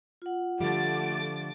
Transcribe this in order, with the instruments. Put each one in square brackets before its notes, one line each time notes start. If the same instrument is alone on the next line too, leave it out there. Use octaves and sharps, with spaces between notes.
[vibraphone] F4 F#5
[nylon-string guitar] D3 F3 G3 [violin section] A3 D6 A6